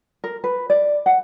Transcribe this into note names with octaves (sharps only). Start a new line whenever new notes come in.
A#4
B4
D5
F#5